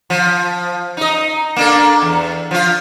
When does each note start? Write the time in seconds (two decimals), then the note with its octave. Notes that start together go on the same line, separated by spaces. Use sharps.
0.10 F3
0.97 D#4 D#5
1.56 A#3 D4 A4
2.02 E2
2.51 F3 F4